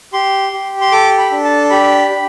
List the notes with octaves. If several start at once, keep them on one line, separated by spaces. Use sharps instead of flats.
G4 C6
G4
C6
A4 D6
B5
D4
A5
G4 B5
G4